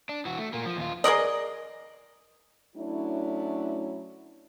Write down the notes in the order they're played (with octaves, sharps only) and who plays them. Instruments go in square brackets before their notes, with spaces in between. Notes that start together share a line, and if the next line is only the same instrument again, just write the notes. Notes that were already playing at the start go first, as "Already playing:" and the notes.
[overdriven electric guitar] D4
E3 F#4
A3
A#2 A#3
F3
D#2 F4
[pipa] G#4 A#4 D5 D#5
[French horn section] F#3 A3 C#4 D4 E4